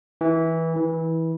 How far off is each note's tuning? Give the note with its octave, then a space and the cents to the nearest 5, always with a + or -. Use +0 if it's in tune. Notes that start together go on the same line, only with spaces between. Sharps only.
E3 -15
E3 -20